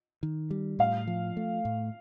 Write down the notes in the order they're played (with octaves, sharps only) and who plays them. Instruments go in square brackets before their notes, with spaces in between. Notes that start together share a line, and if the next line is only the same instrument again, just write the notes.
[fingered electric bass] D#3
G3
[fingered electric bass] A2 [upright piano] F5
[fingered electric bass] F3
A3
A2